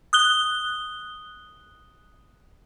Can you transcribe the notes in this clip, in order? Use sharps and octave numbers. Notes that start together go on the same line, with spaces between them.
D#6 F#6 G7